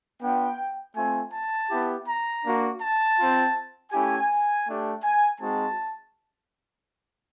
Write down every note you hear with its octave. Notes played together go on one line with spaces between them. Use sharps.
B3 D4 F4 G5
A3 C4 F4 G#5
A5
B3 E4 G4
A#5
A#3 D4 F#4
A5
C4 F4
A3 C#4 E4 G4 G#5
A3 D4 G4
G#5
G#3 C4 D#4 F#4 A5